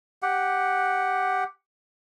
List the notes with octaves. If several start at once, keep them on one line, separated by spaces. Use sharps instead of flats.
G4 F#5